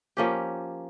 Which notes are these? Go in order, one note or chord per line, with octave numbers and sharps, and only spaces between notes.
F3 A#3 C#4 G4